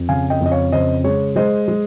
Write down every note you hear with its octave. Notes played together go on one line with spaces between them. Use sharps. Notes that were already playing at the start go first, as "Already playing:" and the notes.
Already playing: F2
C#3 F5 G#5
D#5 G5
F2
D#5
C#5 F5
C#3 C5 D#5
G#3 C#5
G#3 C5 D#5
G#3